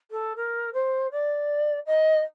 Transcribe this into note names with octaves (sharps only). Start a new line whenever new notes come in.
A4
A#4
C5
D5
D#5